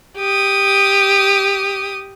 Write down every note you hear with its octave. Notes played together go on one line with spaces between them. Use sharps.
G4 D#6